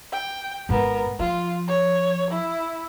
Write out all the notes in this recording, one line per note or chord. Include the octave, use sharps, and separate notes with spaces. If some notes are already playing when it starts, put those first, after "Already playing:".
G5
G#1 G#2 B3 A#4
F3 F4
C#5
E4